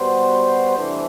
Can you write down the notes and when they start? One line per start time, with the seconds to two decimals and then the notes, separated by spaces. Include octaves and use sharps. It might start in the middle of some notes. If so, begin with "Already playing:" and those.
Already playing: B2 G3 B3 F#4 C5
0.77 C3 E3 A3 D4